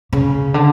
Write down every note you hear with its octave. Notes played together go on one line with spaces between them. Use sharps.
C#3
D3